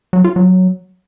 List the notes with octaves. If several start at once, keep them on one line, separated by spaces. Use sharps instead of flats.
F#3
F4
F#3